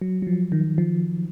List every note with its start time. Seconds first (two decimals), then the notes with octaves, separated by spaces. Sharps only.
0.02 F#3
0.22 F#3
0.27 F3
0.52 D#3
0.78 F3